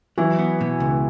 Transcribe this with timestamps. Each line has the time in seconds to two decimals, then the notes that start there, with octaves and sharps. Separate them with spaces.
0.18 E3 F#3 E4
0.38 B3
0.61 B2
0.80 C#2